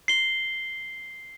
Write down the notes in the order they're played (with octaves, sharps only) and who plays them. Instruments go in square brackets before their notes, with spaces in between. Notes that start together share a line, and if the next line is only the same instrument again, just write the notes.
[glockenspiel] C7 G7